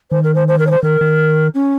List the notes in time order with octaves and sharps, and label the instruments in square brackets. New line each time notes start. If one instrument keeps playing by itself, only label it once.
[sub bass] D#3 [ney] C5
[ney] A#4
C5
C5
A#4
C#5
C5
[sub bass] D#3 [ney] A#4
[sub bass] D#3
[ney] C#4